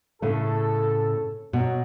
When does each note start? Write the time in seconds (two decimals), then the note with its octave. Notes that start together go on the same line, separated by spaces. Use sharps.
0.22 A2 C#3 A3 A4
1.53 B2 F#3